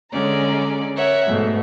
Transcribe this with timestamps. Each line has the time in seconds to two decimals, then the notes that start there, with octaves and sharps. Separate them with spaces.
0.12 D3 G#3 C#4 D5 A#5
0.94 A#4 C#5 E5 F#5
1.25 G#2 B2 A3